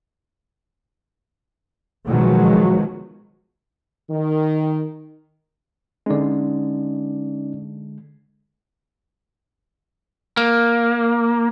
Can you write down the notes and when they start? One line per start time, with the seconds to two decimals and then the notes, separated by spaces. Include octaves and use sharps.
2.06 B2 D#3 F3 F#3 G#3
4.10 D#3
6.06 D3 G#3 C#4 D#4 D5
10.37 A#3